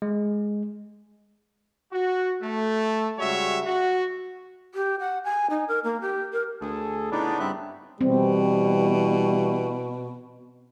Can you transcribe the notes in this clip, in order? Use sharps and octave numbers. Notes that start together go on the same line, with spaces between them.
G#3
F#4
A3
C#3 G3 G#3 F#4 C#5 E5
F#4
G4
F#5
G#5
D#4
A#4
A#3
G4
A#4
D2 G#4 A4
A2 C#3 B3 D4 D#4 D5
G2 C4 E5 F#6
B2 E3 G3 C4